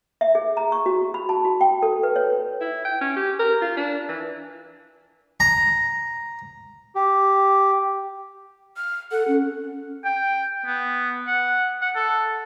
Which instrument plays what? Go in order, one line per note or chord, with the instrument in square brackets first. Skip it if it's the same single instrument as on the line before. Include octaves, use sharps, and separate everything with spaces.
[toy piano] E5
G#4
A#5
C#6
F#4
B5
A5
F#4
G5
A4
B4
C#5
[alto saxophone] E4
G5
C#4
G4
A#4
F4
D4
E3
[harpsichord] A#5
[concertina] G4
[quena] F6
[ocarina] A4 [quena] F#5
[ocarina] C#4
[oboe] G5
B3
F#5
F#5
A4